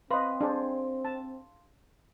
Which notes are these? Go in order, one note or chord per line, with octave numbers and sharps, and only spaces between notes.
C4 B4 D#5 F5 C6
D4 G#4 C5
A5